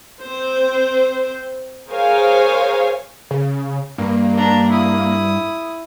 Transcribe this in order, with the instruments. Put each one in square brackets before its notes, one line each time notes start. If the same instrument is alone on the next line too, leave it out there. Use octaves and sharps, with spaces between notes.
[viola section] C4 C5
G#4 A#4 C5 C#5 F5 G#5
[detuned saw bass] C#3
[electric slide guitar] G2 [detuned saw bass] A#3
[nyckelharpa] D4 A#5
E4 D#6